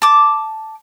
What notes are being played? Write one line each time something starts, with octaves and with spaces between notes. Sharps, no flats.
A5 D6